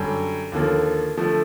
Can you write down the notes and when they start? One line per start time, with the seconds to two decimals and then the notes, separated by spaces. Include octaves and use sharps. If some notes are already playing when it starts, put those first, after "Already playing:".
Already playing: F#2 D3 G3
0.52 D#2 D3 F3 A#3
1.17 D3 F3 A3